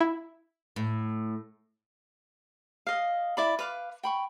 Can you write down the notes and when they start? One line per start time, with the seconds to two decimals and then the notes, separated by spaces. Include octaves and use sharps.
0.01 E4
0.76 A2
2.87 D#5 F5
3.37 E4 D5 B5
3.59 B4 F5 D6
4.03 G5 B5 C#6